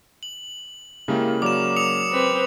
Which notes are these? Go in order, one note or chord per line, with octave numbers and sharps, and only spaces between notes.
F#7
C#3 G#3 A#3 E4 G4 A#4
F#3 A#4 D5 D6 E7
D#6 C#7 F7
C4 B4